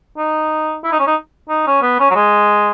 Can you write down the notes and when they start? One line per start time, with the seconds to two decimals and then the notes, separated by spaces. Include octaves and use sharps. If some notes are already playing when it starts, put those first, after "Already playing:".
0.17 D#4
0.84 E4
0.92 D#4
1.00 C#4
1.07 D#4
1.49 D#4
1.67 C#4
1.82 B3
2.00 C#4
2.11 F#3
2.15 G#3